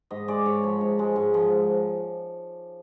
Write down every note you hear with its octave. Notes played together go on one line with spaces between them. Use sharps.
G#2 D#5
G#3 D5
G#2 C#5
F3 C#5
G#2
G#3
G#2
F3